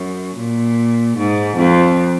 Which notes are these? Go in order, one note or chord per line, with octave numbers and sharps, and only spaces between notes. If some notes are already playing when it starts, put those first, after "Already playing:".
Already playing: F#2
A#2
G#2
F2